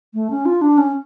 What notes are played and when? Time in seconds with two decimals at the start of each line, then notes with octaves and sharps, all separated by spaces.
0.14 A3
0.31 C#4
0.46 F4
0.62 D4
0.78 C#4